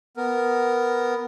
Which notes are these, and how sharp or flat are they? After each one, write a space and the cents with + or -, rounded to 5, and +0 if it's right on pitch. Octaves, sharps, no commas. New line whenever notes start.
B3 +0 A#4 +0